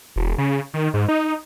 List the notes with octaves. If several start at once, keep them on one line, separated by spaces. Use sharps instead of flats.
E1
C#3
D#3
G#2
D#4